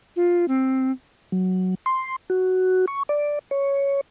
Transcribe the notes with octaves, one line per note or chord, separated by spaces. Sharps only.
F4
C4
F#3
C6
F#4
C#6
D5
C#5